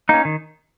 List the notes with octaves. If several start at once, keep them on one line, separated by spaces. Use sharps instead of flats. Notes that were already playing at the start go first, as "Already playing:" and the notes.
A#3 C#4 D#4
D#3